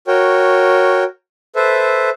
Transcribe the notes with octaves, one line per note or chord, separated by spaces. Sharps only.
F#4 A#4 C#5 G5
A4 B4 C5 E5